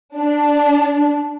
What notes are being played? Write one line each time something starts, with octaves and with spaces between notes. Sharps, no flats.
D4